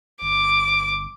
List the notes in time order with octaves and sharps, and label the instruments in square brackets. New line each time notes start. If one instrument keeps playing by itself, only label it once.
[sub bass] G1 [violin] D6